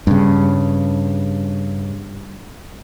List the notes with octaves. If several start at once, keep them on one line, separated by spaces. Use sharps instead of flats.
G2 C#3